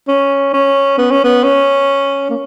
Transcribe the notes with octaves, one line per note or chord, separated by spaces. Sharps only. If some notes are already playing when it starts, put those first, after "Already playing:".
C#4
C#4
B3
C#4
B3
C#4
A#3